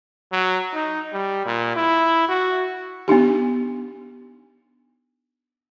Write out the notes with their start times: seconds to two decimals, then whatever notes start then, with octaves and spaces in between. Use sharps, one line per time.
0.32 F#3
0.74 D#4
1.13 G3
1.46 A#2
1.76 E4
2.28 F#4
3.08 B3 D4 D#4 G4